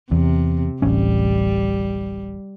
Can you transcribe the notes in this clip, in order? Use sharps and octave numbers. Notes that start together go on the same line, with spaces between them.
E2 C3
D1 A1 G3 C#4